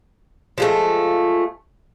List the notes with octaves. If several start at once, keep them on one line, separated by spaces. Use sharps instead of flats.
F3 G#3 A3